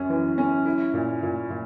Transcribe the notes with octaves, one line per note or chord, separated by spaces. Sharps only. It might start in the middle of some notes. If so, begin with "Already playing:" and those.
Already playing: F#2 C#4
E3
C#4
E4
A#2
A#2
A#2